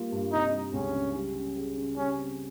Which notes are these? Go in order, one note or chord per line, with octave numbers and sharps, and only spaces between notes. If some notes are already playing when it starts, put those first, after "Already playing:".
Already playing: G3 A#3 F4
G2
C3 D#4
G3
C#2 C#4
C#2
G3
C#4
G#4
C#3
G3 C#4
C4